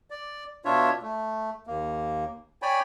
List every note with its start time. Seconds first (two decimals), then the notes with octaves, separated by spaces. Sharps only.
0.10 D5
0.65 B2 D4 F4 C#5 E5
1.02 A3
1.67 D#2 A#3
2.62 C#5 D5 G5 G#5 B5